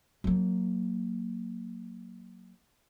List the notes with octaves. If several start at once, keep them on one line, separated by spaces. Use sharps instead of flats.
F#3 A#3